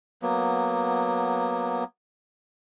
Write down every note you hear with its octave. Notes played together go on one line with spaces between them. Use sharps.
F#3 A#3 B3